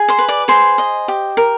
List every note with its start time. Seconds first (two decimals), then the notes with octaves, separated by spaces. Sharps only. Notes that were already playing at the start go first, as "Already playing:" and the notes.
Already playing: G#4
0.08 C5 C6
0.19 B4
0.28 D5 D6
0.48 G#4 C5 C6
0.78 D#5
1.08 G4
1.37 A#4